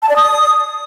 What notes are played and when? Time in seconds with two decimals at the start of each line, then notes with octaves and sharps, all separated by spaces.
0.02 A5
0.09 D5
0.16 D#6